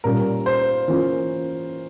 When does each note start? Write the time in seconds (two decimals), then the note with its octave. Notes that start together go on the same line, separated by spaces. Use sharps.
0.04 A#2 G3 C#4 A#4
0.46 C5
0.88 E3 A#3 C#4 F4